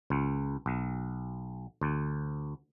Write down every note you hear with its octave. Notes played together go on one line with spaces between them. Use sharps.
C#2
B1
D2